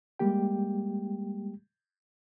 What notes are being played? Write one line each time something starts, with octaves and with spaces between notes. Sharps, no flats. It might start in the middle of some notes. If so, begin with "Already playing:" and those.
G3 G#3 A#3 G4 G5